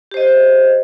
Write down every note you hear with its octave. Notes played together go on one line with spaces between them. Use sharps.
G4 C5 D#5